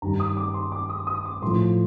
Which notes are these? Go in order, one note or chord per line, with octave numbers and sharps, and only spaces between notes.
G2 D#3 G3 A#5
D#6
D6
C6
D6
D#6
D#6
D6
A2 F3 C6